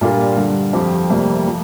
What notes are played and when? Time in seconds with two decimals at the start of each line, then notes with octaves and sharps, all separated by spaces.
0.01 A#2 G3 D4 F4 A#4
0.37 G2 D3 G3
0.73 F2 F3 C4 G4
1.09 F1 F2 C3 G3 A#3
1.47 F3